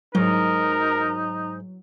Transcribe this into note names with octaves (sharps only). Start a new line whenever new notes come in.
G#2 F#3 D#4 A#4